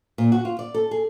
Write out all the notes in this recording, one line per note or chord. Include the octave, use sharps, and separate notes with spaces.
A#2
F#4
F4
D5
A4
G#4